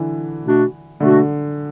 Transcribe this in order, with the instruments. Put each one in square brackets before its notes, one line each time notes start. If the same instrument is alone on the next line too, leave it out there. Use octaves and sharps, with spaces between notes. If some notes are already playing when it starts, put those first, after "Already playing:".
Already playing: [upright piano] D3 E3
[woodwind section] B2 A3 D4 F#4
[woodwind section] B2 A3 D4 F#4 [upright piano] D3